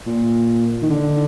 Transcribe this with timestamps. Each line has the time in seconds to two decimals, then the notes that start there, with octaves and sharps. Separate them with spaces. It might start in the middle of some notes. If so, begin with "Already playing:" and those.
0.06 A#2
0.82 D#3
0.90 D3